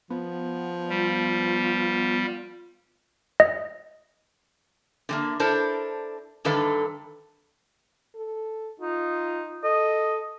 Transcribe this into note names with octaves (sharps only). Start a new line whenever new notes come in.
F3 B3
G3 F4
D#5
D3 G#3 A#3
D4 E4 A4 A#4 C5
G2 D3 D#3 A4 B4 F5
A4
D#4 F4
A4 D#5